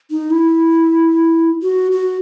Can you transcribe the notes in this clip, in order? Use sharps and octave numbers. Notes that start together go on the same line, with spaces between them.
D#4
E4
F#4
F#4